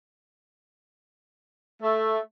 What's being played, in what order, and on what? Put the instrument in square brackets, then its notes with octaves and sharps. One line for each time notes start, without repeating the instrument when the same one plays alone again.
[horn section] A3